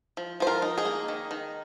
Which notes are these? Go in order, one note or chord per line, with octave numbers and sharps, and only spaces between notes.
F3
F3 C5
F4 A#4
D#4
D#4 G#4
A#3
D#3
D#3